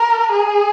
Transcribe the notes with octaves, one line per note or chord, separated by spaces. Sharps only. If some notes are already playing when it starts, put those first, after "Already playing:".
Already playing: A#4
G#4